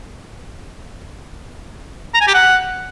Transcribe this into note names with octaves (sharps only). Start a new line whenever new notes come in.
A#5
G#5
G4
F#5